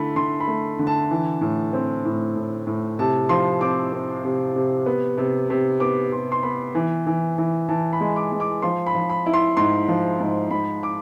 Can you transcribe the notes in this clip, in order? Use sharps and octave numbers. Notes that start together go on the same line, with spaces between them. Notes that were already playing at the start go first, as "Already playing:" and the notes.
Already playing: D3 A3 E4 B5
D3 C6
B5
A3
D3
A5
E3
A2
C4
A2
A2
A2
C3 A5
F3 C6
C4 D6
C4
C3
C3
B3
C3
C3
B3 D6
C3 C6
C6
B3 B5
E3
E3
E3
E3 A5
B5
G#3
D6
G#3
D6
F3 C6
B5
F3
B5
E4
C6
G#2 C6
F3
G#2
G#2 B5
D6